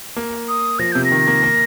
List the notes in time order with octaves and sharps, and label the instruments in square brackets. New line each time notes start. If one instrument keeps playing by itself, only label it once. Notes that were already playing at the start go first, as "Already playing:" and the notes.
[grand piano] A#3
[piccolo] D#6
[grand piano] F3 [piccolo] A#6
[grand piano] C3 [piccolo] G6
[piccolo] A#6
[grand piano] D#3
A#3
A#3